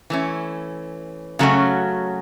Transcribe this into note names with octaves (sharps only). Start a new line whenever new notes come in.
E3 A3 C#4
C#3 F#3 A3 C#4 F#4